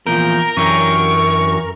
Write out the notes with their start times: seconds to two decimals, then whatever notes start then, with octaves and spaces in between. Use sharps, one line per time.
0.07 E2 A#2 F3 A#4 G6
0.57 F#2 E3 D4 G4 C#6